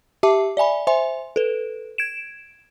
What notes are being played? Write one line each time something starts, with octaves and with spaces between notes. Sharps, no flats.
G4 E5 A5 D6
D5 E5 G#5 B5
C5 E5 G#5 C6
A4 B4
G#6 D7 E7